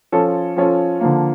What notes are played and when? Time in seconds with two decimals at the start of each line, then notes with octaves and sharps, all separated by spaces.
0.12 F3 C#4 F4 A4
0.57 F3 C#4 F4 A4
1.01 D3 F3 A#3